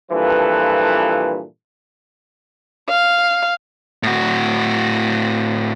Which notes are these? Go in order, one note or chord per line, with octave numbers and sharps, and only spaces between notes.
G2 A#2 E3 F3 A4 B4
F5
A2 F#4